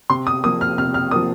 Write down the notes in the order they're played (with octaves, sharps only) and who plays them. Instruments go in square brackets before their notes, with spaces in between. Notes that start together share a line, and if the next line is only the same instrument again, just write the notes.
[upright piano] C3 C6
D#6
F3 A#3 D#6
F6
C3 F6
F6
F3 A#3 D#6